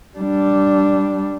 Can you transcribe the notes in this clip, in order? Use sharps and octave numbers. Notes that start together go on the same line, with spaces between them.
G3 D4